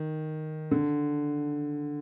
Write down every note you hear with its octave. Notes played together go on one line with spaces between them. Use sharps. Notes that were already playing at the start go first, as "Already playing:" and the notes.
Already playing: D#3
D3